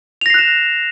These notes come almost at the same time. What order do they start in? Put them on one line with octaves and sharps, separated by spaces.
F7 A#6 C7 F#6 E7